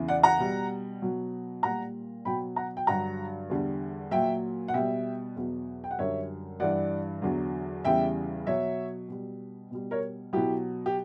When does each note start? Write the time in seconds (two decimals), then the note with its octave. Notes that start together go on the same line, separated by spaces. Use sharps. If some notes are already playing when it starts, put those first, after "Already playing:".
Already playing: E2 C#3 E3
0.08 D5 F#5
0.23 F#5 A#5
0.39 B2 G3
1.02 B2 F#3
1.63 A#2 G3 F#5 A#5
2.25 B2 F#3 G5 B5
2.56 F#5 A#5
2.77 G5
2.87 G2 D3 F#3 F#5 A#5
3.49 E2 D3 G3
4.11 A#2 F#3 E5 G5
4.68 F#5
4.74 B2 G3 E5 G5
5.36 E2 B2 F#3
5.84 G5
5.91 F#5
5.99 F#2 D3 G3 C#5 E5
6.60 G2 E3 G3 D5 F#5
7.22 E2 D3 F#3
7.85 E2 C#3 E3 G3 E5 G5
8.46 B2 F#3 C#5 E5
9.09 B2 G3
9.71 B2 G3
9.91 A#4 C#5
10.33 B2 F#3 E4 G4
10.86 G4